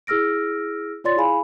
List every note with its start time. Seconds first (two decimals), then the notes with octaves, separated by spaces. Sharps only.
0.07 E4 G#4 E6 F6 A#6 D7
1.04 F4 C#5 D5 C6 A6
1.16 E4 G#4 F5 G#5 B5